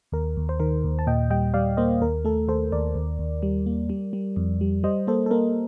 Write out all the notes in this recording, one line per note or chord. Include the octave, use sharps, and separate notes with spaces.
D#2 A#4
D#2
C5
D#3 A#4
D#2
A5
A#2 D#5 G5
G3 D#5 G5
G3 D5 F5
A#3 C5 D#5
D#2 A#4
A3 A4
D#2 A4 C5
D#2 A#4 D5
D#2
D#2
G3
A#3
G3
G3
F2
G3
G3 C5 D#5
A#3 A4 C5
A4
A#3 A#4